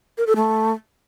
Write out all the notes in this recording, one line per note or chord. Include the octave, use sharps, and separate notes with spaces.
A#4
A4
A3